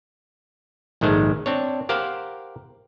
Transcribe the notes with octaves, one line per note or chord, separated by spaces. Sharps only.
A#1 G#2 D#3 G#3 A3 C5
C4 D4 C#5
G4 A#4 C5 F5 F#5